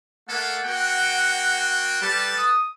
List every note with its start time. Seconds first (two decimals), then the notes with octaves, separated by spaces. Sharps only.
0.29 A3 A#3 A4 F#5
0.65 A#3 F#4 G5
2.01 G3 A4 B4 A5
2.37 D#6